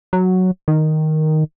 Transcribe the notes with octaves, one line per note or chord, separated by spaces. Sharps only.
F#3
D#3